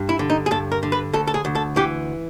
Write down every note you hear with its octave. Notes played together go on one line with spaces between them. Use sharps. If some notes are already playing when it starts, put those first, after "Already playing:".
Already playing: G2
E4
D3
D#4
G#4
G2 A4
A#4
D3
B4
D2 A4
A4
G#4
D2
A4
E3 G4